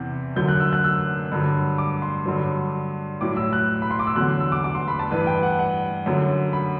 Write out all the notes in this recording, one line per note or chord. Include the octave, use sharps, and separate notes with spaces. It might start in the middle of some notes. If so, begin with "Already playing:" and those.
Already playing: E2 C3 E3
F#2 D3 F#3 G6
F#6
E6
F#6
E6
G2 D3 F#3
D6
C6
G2 D3 F#3
A2 F#3 D6
E6
F#6
B5
C6
D6
E6
E2 D3 F#3 F#6
E6
D6
D6
C6
B5
A5
G2 E3 B4
G5
F#5
F#5
F#2 D3 F#3
B5